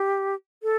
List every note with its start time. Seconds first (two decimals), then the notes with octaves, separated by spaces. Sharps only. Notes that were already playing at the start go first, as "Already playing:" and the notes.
Already playing: G4
0.63 A4